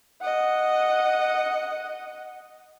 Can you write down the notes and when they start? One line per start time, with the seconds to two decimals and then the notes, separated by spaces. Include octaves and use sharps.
0.21 D#5 F#5